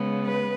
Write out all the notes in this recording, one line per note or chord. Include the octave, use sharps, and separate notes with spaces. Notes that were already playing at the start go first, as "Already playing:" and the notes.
Already playing: C#3 G#3 B3
B4